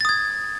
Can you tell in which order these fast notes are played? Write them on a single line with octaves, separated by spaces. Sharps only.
A6 D#6 G#6